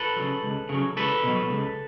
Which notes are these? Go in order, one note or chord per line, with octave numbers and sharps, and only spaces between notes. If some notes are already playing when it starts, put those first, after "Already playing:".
Already playing: A4 B4
C#3 F#3
C#2
C#3
F#3
C#2 A4 B4
B2 F#3
C#2